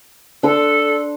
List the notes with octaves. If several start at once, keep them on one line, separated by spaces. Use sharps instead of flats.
D4 A4 C6